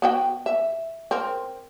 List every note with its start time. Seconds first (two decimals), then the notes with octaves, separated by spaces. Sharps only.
0.02 B3 F#4 G5
0.46 E5
1.11 C4 A#4